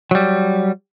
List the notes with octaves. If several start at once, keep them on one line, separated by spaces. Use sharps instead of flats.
F#3 G3